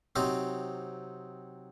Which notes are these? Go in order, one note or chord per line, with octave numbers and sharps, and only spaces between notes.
C3 F#3 C4 D#4